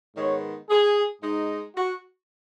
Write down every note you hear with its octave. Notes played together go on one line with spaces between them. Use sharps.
G#2 D#3 G#3 B3 C#5
G#4
G#2 G#3 D#4
F#4